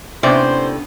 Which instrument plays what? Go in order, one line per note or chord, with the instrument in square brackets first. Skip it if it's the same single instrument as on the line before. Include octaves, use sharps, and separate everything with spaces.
[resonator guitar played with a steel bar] A2 C3 D5 [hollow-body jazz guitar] B3 C#4 D4 [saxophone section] C5